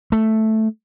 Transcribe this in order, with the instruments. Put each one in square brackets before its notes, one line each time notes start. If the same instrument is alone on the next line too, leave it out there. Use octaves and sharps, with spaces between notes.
[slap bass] A3